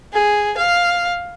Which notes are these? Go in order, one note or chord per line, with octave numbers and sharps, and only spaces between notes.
G#4
F5